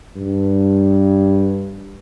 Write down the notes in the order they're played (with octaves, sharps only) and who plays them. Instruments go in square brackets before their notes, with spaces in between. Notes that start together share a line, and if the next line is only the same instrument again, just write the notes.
[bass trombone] G2